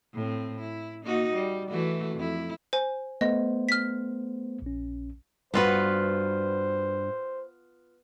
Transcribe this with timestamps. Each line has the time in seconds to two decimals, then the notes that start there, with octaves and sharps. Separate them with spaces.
0.14 A2 C4
0.60 E4
1.05 A#3 D#4 F#4
1.34 G3
1.69 E3 A3 F#4
2.16 F2 E4
2.73 C5 G#5
3.21 A3 B3 C5 D#5
3.69 F6 B6
4.62 A#1 C#4
5.54 G2 B3 F4 F#4 B4 C5